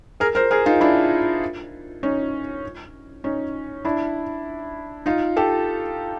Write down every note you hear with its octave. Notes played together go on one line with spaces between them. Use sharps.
G#4 A#4
A#4 C5
G#4 A#4
D#4 F4
D4 E4
C#4 D#4
C#4 D#4
D4 E4
D#4 F4
G4 A4